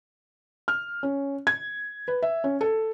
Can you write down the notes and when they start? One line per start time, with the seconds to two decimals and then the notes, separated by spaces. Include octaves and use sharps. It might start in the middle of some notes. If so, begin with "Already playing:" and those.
0.68 F6
1.03 C#4
1.47 G#6
2.08 B4
2.23 E5
2.44 C#4
2.61 A4